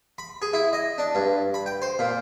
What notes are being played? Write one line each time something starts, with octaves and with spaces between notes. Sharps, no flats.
B5
G#4
E4
D#5
D4
G2
B5
G5
C5
A#2